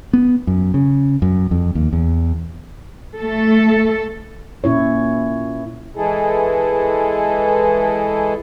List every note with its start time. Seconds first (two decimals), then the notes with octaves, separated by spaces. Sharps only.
0.13 B3
0.47 F#2
0.74 C#3
1.22 F#2
1.51 F2
1.75 D#2
1.93 E2
3.16 A3 A4
4.64 A#2 C#4 E4 C#5
5.96 E3 G#3 E4 G#4 A4